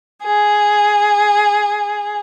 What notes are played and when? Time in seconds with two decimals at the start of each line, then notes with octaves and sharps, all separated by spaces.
0.23 G#4